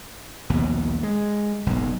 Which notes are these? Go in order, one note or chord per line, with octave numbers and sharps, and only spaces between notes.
A#1 D#2 B2
G#3
F#1 B1 G#2